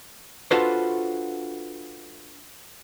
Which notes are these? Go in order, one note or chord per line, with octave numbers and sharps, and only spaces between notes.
D4 F4 F#4 A4 B4 C5